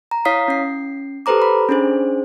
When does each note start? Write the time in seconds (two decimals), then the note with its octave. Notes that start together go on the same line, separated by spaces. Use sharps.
0.11 A#5
0.25 E4 C#5 F5 D#6 B6 C7
0.48 C#4 C7
1.26 G4 A4 B4 C5 A#5 D6
1.42 B5
1.69 C#4 D4 G#4 C5